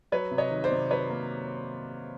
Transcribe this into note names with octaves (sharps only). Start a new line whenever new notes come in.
F#3 B4 C#5
C3
C#5 D#5
D#3
C5 D5
C3
F#3 B4 C#5
A#3